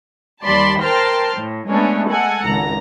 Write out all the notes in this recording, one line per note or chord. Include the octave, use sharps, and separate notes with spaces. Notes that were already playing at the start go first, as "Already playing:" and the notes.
D#2 G3 D5 A5 B5 C6
A#4 C5 G5 A5 C6 F6
A2
G#3 A3 B3 C#4 D4
G#3 A4 F#5 G#5
G#1 C#2 A#5